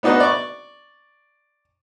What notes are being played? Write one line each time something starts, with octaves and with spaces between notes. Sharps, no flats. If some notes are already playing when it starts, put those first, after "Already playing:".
B3 D4 D#4 F#4 B4
D5 C#6